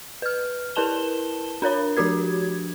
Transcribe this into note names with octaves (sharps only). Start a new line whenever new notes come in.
B4 F6
E4 A#4 B4 A5 E7 G7
D4 A#4 C#5 B5
F3 D4 F#4 G4 G#6